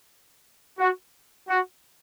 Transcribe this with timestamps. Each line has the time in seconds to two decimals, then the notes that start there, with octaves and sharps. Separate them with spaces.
0.78 F#4
1.48 F#4